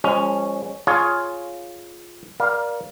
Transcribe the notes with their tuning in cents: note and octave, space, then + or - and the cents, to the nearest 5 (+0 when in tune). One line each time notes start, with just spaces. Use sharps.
F3 +0 G#3 -30 C#4 +0
F4 +0 G#4 +15 C#5 +0
A#4 +30 D5 +0 F5 +0